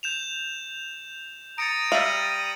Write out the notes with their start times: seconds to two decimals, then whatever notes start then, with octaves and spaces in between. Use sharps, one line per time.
0.03 G6 E7 F7
1.58 A#5 D#6 A6 C#7 D7
1.92 G3 E5 F5 D#7 F#7